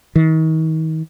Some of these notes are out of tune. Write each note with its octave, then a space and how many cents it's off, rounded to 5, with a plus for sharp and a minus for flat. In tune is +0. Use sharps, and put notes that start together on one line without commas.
D#3 +40